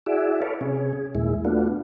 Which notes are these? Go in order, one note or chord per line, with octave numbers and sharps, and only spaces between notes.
E4 F#4 G#4 D5 E5
A4 B4 C#5 D5 F5
C3 C#4 G#4
G#4
D#2 A#2 G#3 E4
A3 B3 D4 F4 F#4